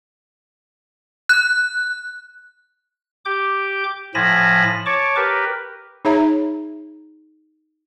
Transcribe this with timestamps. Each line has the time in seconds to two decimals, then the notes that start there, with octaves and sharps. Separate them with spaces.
1.29 F#6
3.25 G4 D6 G6
4.15 A2 F3 G#5 A5 B5 A#6
4.86 C#5 A5 C#6 D6
5.16 G4 A#4 B4
6.05 D#4 G#4 C#5 E5 A#5